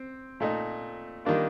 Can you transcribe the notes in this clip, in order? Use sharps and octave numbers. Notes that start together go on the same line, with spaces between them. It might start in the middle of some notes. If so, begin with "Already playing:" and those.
Already playing: C4
A#2 A3 D#4
D#3 G3 A#3 D4 F4